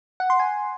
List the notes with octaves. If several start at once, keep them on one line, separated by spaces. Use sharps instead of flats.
F#5
C6
G#5